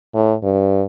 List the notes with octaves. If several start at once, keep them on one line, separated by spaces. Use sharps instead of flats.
A2
G2